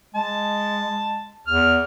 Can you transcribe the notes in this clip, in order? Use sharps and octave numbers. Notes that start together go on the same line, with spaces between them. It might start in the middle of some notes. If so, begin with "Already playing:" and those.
G#3 A5
E2 F6